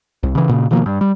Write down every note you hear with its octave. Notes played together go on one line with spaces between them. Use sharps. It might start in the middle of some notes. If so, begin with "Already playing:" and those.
C2
C#3 E3
A#2 C#3
B2 D#3 F3 A#3
G2
G3